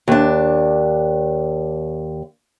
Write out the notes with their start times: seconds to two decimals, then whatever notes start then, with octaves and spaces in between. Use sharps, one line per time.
0.08 D#2 D4